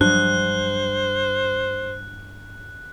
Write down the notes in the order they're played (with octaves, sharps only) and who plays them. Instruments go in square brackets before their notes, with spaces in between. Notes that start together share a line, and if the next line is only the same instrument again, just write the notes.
[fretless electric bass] G2 [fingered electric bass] F3 F#3 D4 [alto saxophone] C5 [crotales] F#6